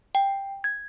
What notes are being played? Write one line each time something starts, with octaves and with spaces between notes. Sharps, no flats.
G5
G#6